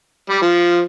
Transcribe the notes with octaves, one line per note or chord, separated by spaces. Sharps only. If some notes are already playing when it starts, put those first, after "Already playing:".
G3
F3